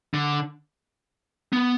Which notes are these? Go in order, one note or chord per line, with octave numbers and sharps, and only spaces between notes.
D3
B3